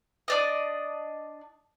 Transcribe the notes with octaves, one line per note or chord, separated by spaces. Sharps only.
D4 D5 D#5